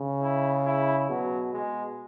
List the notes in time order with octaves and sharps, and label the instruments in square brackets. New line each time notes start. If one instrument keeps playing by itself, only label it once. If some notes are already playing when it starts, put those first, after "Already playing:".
Already playing: [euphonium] C#3
[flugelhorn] E4
E4
[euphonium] B2 [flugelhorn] F#3
[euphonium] B2 [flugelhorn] G#3